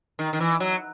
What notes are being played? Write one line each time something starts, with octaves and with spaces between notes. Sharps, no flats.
D#3
D#3
E3
F#3